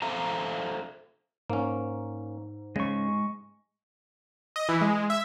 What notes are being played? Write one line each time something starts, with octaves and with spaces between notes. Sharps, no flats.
A4 C5 E5 F5 A#5
G#2 A#3 C#4
C#3 G#3 C#6
D#5
E3
G#3
E5